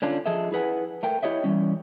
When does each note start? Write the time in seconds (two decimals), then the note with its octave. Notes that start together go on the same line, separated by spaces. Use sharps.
0.02 D3 C#4 D4 F4
0.26 F3 G#4 A4 D#5 E5
0.52 E4 G#4 B4 F#5 G#5
1.03 A3 A#4 G5
1.23 E4 G4 C#5 D#5 E5
1.44 E3 F3 G3 C#4